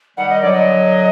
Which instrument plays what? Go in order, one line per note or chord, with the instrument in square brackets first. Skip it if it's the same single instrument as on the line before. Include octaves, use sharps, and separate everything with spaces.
[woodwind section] D#3 G3 [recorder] F#5
[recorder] D#5
[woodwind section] D3 F#3 [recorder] D5
[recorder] D#5